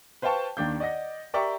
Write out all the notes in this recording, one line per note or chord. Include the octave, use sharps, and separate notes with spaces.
B4 C5 F5 G5 A5 C#6
D#2 D#3 D4 G6
D5 D#5 F#5 A#6
G4 A#4 D5 E5 G5 C#6